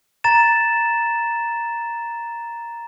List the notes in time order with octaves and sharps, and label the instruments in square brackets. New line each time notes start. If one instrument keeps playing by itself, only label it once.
[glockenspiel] A#5 A6 E7